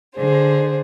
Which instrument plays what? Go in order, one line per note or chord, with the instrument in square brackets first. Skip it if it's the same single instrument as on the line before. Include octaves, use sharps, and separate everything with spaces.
[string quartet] D3 G#4 C5